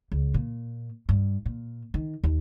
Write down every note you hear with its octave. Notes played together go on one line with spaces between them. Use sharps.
C#2
A#2
G2
A#2
D#3
D#2